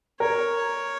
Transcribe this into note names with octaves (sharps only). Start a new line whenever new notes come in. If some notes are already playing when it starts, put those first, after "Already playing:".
A#4 C#5